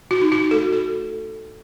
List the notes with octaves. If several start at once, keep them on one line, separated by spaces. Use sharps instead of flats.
F#4
D#4
F#4
A3 A4
A4